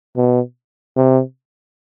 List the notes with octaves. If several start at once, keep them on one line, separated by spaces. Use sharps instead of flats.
B2
C3